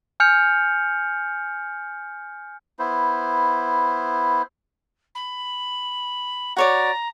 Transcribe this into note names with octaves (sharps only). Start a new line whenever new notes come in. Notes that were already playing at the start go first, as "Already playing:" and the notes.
G#5 F6 G6 C#7 F7
B3 E4 C5
B5
F#4 C#5 D5 A#5